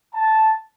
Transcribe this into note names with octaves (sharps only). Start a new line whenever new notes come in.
A5